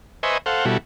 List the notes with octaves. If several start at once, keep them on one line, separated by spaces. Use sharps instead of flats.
B4 C5 D#5 E5 G#5 C#6
A4 C5 F5 F#5
B2 G3 E4 F#4 A4